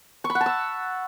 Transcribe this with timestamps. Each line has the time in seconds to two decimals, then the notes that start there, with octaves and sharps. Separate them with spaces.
0.24 C#6
0.30 B5
0.35 F#5
0.41 A5
0.46 E6